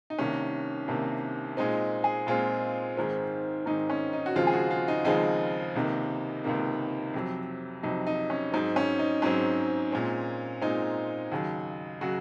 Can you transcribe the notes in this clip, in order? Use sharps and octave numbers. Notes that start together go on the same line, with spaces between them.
D#4
C2 C3 D#3 A#3 C#4
C2 C3 D#3 A#3
A#2 G#3 C4 D#4
G#4
A#2 G#3 C4 F4
G#2 D#3 G#3 C4
G#2 D#3 G#3 C4 D#4
C#4
D#4
F#4
D#2 C#3 F3 G#3 C4 F4
G#4
F#4
F4
D#4
D#2 C#3 F3 G#3 C4 D#4
C#2 C3 D#3 A#3
C#2 C3 D#3 A#3
F2 C3 F#3
F2 C3 F#3 D#4
D#4
C#4
G#2 F#3 C4 D#4
C#4
D#4
G#2 F#3 C4 C#4
A#2 G#3 C4
A#2 G#3 C4 D#4
D#2 C#3 F#3
C#3 F#3 F#4